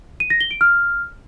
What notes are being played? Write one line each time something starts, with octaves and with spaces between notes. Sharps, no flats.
D#7
A#6
G7
D7
F6